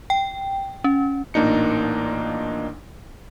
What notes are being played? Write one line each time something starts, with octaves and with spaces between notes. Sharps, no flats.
G5
C#4
A1 A#2 A#3 D4 D#4 C#7